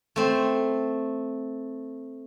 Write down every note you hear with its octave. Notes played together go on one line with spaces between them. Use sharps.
A3 C4